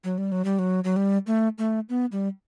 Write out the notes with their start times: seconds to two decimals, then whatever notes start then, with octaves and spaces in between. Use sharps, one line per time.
0.04 F#3
0.18 G3
0.32 F#3
0.45 G3
0.59 F#3
0.84 F#3
0.96 G3
1.27 A3
1.58 A3
1.89 B3
2.12 G3